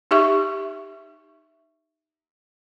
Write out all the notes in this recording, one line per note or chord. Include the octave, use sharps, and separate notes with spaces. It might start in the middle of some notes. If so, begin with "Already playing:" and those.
D#4 G4 E5 C#6